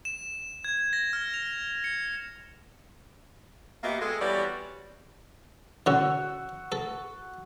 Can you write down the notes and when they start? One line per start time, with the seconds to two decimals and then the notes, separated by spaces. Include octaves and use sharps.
0.05 E7
0.64 G#6
0.93 A#6
1.13 F6
1.34 F7
1.84 C#7
3.83 A#3 B3 F#4 G4 D#5 E5
4.01 G#3 G#4 A4
4.21 E3 G3 B3 F#4 C#5 D5
5.86 D3 C#4 F#4 E6
6.72 A4